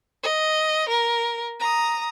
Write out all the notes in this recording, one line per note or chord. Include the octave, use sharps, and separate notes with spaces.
D#5
A#4
A#5 D#6